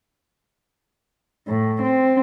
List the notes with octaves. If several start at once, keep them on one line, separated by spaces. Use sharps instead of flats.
A2
C4